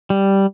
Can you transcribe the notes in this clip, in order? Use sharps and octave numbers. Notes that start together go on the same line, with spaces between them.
G3